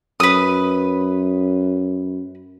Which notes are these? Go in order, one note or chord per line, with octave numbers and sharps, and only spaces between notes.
F#2 B4 D#6